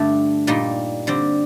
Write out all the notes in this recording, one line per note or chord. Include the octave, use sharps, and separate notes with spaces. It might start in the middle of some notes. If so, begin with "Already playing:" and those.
Already playing: G2 D3 A3
A#2 G3 A#3 D#4
D3 G3 C4